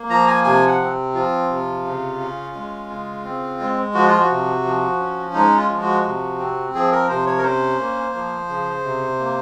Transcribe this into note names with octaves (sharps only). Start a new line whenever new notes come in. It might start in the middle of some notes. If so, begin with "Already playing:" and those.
Already playing: A#3
F3 A#5
G#5
C3 G#5
F#5
C4
F3 F4
C3
C#3
C#4
G#3
C#3
C4
G#3
F3 F#4
F4
F#4
C3
F3
C#4
G#3 D#4
F4
F3
F#4
C3
C4
F3 G#4
A#4
C3 C5
C#5
A#4
C#4 C5
A#3
F3
C#3
C3
A#3